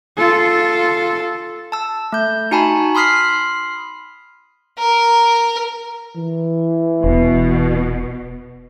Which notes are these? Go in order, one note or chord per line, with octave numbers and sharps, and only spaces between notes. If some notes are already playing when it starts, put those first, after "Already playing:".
F4 A4
A5 E6
A3 G6
D#4 F#4 G#5 A5 B5
B5 C6 D#6 F6 B6 C7
A#4
E3
E1 B2